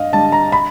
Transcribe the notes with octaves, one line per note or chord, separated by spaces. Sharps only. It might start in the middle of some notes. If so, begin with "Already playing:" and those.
Already playing: G2 D#5 F5
D3 G3 A5
A#5
B5